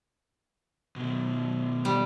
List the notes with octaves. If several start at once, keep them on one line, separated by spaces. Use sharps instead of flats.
B2 D#3
G3